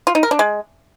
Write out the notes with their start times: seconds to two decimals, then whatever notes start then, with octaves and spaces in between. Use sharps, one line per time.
0.07 F4
0.15 D#4
0.23 A#4
0.31 D4
0.39 G#3